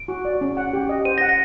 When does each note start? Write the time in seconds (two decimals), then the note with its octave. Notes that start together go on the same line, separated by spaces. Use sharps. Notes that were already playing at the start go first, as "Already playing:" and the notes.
Already playing: D7
0.08 F#4
0.25 D5
0.41 C#4
0.57 F#5
0.73 G4
0.89 D#5
1.05 C5 D#7
1.18 A#6
1.21 F#5
1.29 A#6